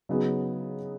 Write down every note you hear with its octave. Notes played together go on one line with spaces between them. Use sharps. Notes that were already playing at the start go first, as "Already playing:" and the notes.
C#3 F#3 B3 D#4 G#4